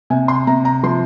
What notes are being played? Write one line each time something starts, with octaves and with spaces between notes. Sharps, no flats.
C3 G#5
C6
C3 A#5
A#5
F3 C6